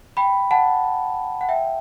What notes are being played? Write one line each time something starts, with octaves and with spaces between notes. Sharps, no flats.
G5 B5
F#5 A5
F#5
E5 G5